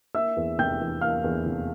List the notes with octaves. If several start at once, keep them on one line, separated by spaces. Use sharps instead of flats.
A#3 E5 E6
E2
F1 G5 G6
E3
A#3 F5 F6
E2
F1